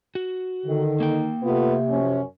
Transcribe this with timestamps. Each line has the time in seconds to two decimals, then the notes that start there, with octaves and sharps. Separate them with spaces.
0.15 F#4
0.66 D3 D#3
1.00 A#3 G5
1.43 C3 A3 B3 F4
1.89 F#2 F3 C#4